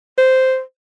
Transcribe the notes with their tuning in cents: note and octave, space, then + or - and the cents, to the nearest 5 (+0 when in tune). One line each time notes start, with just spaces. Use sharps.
C5 -5